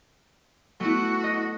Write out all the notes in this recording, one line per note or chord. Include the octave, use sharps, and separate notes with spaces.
A3 B3 E4 F#4
D#5